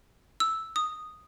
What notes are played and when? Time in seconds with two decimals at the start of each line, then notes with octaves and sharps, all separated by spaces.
0.40 E6
0.76 D#6